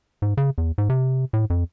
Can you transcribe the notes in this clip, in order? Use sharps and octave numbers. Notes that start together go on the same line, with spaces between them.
G#2
C#3
E2
G#2
C3
A2
F2